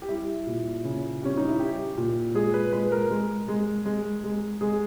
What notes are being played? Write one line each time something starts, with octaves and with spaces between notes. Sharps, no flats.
G4
G3 E4
A#2
C#3
G3 C#4
D#4
E4
G3 G4
A#2
G#3 G#4
B4
G#3 B4
A#4
G#3
G#3
G#3
G#3
G#3 G#4